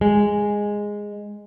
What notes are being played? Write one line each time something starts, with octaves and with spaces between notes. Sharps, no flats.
G#3